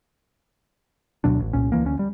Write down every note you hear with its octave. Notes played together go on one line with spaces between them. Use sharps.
D2 B2 F#3 D4
A1
C2 A#2 C#4
D2 E3 A#3
D2 C#4
G3